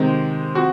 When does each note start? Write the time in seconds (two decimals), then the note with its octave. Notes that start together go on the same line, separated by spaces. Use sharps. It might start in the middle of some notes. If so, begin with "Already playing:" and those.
Already playing: C3 D#3 G#3 C4
0.55 F3 C4 F#4